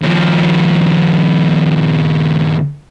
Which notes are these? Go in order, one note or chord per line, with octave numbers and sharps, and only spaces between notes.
D#2 F3